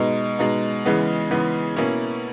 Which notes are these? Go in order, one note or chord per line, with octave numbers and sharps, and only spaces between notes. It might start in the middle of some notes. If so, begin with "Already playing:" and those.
Already playing: B2 G#3 D#4
B2 G#3 D#4
C#3 E3 G#3 B3
C#3 E3 G#3 B3
B2 A#3 C#4 E4